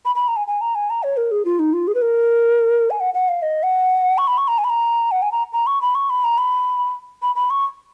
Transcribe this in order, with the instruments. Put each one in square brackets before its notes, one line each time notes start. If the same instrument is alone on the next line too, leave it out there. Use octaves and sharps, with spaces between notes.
[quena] B5
B5
A#5
G#5
G#5
A#5
G#5
A#5
C#5
A#4
G#4
F4
D#4
F4
G#4
B4
A#4
G#5
F#5
F#5
F5
D#5
F#5
C#6
B5
C#6
A#5
G#5
B5
A#5
F#5
G#5
A#5
A#5
C#6
B5
C#6
B5
A#5
B5
B5
B5
C#6